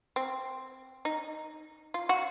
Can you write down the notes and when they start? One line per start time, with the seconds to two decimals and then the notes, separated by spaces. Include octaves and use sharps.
0.16 C4
1.05 D#4
1.94 F4
2.09 F#4